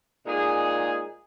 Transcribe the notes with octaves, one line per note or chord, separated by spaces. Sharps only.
A#2 G#3 D#4 G#4